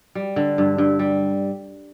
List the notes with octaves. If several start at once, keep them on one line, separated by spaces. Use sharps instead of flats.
G3
D3
G2
G2
G3